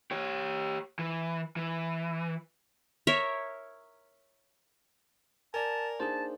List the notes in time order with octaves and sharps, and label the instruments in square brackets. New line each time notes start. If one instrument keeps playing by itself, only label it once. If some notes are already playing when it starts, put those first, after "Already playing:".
[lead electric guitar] G4 C#5
E3
E3
[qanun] A#4 C#5 E5
[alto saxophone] A#4 [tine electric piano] D5 G#5 [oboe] A5
[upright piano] A#3 D4 D#4 [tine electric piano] G#4 C5 [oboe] A5